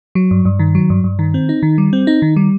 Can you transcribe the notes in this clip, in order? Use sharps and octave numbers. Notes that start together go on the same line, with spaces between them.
F#3
G2
G2
D#3
F#3
G2
G2
D#3
C4
D#4
D#3
G3
C4
D#4
D#3
G3